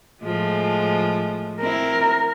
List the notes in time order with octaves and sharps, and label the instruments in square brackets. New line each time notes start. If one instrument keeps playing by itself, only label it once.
[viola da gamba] A2 F3 G#3
[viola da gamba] C4 E4 [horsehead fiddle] A#4